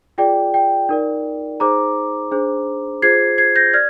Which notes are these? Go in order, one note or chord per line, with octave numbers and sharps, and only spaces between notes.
F4 G#4 D5 G5
G5
D#4 A#4 D5
D#4 G#4 C5 A#5 D6
D4 G#4 C5
F4 G#4 C5 G#6 C7
G#6 C7
G6 A#6
D5 F6 G#6